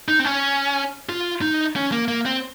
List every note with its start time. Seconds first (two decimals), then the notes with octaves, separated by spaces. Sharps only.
0.08 D#4
0.19 C4
0.25 C#4
1.09 F4
1.41 D#4
1.76 C#4
1.92 A#3
2.08 A#3
2.26 C4